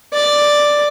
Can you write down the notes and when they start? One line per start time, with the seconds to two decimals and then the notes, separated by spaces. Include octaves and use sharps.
0.13 D5